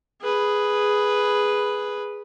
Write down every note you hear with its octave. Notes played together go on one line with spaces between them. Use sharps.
G#4 B4